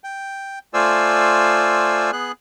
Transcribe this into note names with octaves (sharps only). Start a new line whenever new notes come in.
G5
A3 F4 C5 D5 G#5 E6
B3 G#4 F#6